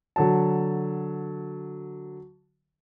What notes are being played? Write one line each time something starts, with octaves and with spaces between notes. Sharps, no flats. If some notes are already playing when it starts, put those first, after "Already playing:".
D3 F#3 A5